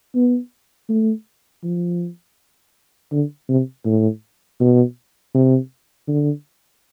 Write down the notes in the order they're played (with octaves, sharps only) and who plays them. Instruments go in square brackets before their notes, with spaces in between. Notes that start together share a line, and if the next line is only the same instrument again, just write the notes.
[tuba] B3
A3
F3
D3
C3
A2
B2
C3
D3